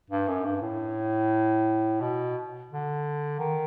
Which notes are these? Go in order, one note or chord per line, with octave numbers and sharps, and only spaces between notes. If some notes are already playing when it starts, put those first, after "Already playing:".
G2
F#2
G2
A2
B2
D3
D#3